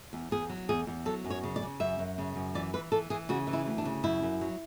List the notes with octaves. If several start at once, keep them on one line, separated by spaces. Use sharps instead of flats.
E2
E2 G#4
F#3
E2 G#4
E2
F#3 A4
F#2
C#5
C#3
D5
C#3
F#2 E5
F#2
C#3
F#2
E3 D5
E3 B4
E3 A4
E3 G#4
C#3 F#4
E3
E4
D2
D4
C#3
F#2 E4
F#2
F#3